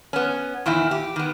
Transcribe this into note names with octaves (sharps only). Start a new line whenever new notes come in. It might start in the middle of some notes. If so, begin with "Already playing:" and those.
B3 C#4
E2 A#2 D#3 E4
G4
D#3 B3